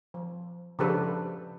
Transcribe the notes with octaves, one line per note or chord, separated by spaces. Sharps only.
F3
C#3 F3 D4 G4 A4 B4